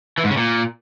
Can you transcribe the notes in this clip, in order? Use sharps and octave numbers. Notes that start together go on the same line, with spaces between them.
E3
G#2
C#3
A#2